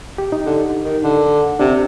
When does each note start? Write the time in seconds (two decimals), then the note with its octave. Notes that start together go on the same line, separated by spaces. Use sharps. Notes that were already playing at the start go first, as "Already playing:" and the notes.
0.18 G4
0.32 D#4
0.46 D3
0.83 D#3
1.03 D3
1.59 C3 D4